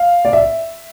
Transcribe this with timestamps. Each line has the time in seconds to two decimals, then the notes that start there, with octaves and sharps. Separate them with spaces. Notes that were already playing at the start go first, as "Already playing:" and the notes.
Already playing: F5
0.25 D5
0.33 E5